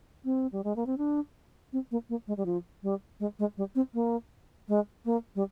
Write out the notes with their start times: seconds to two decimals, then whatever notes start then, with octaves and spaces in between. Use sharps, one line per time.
0.25 C4
0.52 G3
0.64 G#3
0.76 A#3
0.86 C4
0.98 D4
1.73 C4
1.91 A#3
2.09 A#3
2.27 G#3
2.37 G3
2.46 F3
2.83 G3
3.20 G#3
3.39 G#3
3.57 G3
3.75 C4
3.94 A#3
4.68 G#3
5.05 A#3
5.35 G3